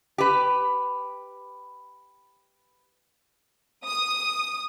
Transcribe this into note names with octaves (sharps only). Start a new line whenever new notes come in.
G4 B4
D#6